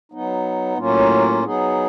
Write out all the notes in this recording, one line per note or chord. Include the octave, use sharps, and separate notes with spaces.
F#3 B3 D#4
A2 F#3 A#3 C#4 F4
F#3 B3 D#4 G#4